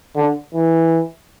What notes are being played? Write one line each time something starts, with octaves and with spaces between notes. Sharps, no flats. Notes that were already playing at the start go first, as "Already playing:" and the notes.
D3
E3